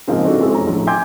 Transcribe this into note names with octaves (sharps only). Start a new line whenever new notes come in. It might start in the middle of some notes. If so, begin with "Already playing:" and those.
G#2 C#3 F3 A#3 C4 G#4
C4 D4 F#4 A4
G#3 C4 E4 F#4 G#4 A4
E1 C#4 A#5
A#1 A2
G5 G#5 C6 D6 G6 G#6